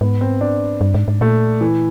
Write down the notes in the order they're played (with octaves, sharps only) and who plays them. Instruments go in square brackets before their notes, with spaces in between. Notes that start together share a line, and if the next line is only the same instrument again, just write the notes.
[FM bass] G#2 [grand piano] B3
[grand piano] C4
D4
[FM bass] G2
G#2
G#2
[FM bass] A#2 [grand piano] A3
[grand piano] E3